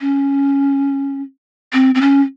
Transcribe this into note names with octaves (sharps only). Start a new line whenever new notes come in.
C#4
C4
C4
C#4